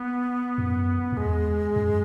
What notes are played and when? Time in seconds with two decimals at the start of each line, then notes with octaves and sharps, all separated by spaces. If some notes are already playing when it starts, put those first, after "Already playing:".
Already playing: B3
0.58 F#2
1.13 F#2
1.17 E2 G#3
1.76 F#2